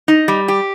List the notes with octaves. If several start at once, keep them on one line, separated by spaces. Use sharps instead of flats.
D#4
G3
G4